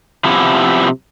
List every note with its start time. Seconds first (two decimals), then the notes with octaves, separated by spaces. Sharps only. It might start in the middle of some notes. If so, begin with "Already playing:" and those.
0.25 C3 F3 B3 E4